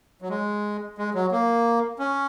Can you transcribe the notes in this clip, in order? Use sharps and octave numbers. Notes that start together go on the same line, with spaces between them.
F#3
G#3
G#3
F#3
A#3
C#4